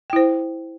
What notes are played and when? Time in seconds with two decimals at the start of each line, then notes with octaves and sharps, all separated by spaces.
0.10 G5
0.13 E4
0.16 C5